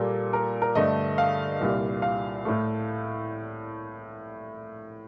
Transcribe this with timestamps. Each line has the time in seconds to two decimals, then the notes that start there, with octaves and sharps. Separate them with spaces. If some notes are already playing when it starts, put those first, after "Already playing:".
Already playing: A#2 G3 A#3 A4
0.33 A#4
0.62 A#4
0.75 G2 D3 A3 D#5
1.18 F5
1.61 C2 A#2 G3
2.02 F5
2.45 A2 A3